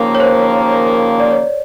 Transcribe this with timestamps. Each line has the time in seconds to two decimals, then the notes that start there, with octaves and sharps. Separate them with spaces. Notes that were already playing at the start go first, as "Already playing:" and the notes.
Already playing: D#2 C#3 F3 A#3 A#4
0.15 C#5
0.20 C5
1.20 D5
1.31 C#5